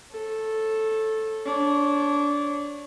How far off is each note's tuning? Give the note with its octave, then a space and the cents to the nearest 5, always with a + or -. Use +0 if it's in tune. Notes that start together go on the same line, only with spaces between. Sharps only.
A4 +0 C#5 -35
D4 -20 C#5 -10